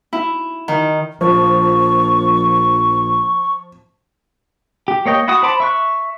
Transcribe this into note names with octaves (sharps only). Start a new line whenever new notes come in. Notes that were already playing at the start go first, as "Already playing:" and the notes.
E4
D#3
A#1 F3 C#6
G4
A#3 C#5 D#5 G5
E4 F#4 F#5 D#6
C5 A5 B5 D6
E5 C#6 F#6